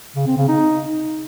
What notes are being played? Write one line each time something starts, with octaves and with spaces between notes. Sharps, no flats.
C#3
C4
C#3
D#4